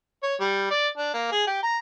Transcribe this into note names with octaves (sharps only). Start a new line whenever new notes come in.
C#5
G3
D5
D4
A#3
G#4
G4
A#5